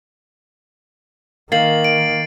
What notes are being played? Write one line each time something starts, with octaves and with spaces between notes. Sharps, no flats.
D#3 A#3 A6 C7 F#7
D7